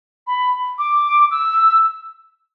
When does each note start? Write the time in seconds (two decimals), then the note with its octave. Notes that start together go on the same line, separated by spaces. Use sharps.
0.27 B5
0.78 D6
1.31 E6